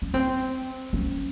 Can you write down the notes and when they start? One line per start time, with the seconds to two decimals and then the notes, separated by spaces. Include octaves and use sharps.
0.02 C#4
0.14 C4
0.93 C#4